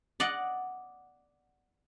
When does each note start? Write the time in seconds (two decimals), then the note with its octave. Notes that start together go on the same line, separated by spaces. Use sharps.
0.20 D5 D#5 F#5